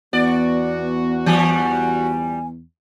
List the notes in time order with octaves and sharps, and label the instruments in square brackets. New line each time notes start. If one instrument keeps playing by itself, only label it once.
[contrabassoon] E2 [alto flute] B3 [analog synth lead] F#4 [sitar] D5
[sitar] E3 G3 [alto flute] G#5